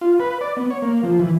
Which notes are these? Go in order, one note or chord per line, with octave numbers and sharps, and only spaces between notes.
F4
B4
D5
B3
C#5
A#3
F3
E3